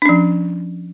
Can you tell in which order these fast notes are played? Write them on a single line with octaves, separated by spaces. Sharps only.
D4 C#4 F3